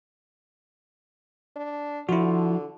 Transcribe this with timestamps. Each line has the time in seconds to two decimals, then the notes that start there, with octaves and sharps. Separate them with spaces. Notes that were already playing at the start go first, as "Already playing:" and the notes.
1.56 D4
2.09 D3 F3 E4 F#4